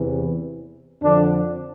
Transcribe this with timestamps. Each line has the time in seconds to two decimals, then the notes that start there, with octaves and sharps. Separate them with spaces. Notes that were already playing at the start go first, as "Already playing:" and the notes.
Already playing: E2 C3 E3
1.01 F2 D3 F3 D4